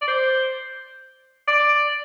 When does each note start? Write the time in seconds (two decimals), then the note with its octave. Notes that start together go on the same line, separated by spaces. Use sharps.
0.01 D5
0.08 C5
1.48 D5